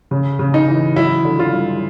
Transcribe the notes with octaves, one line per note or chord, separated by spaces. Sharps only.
C#3
C#3
D#4
E3
F#3 E4
D3
F4
G2